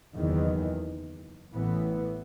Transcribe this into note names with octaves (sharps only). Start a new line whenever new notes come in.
F#1 E2 D#3
A1 A2 E3 B3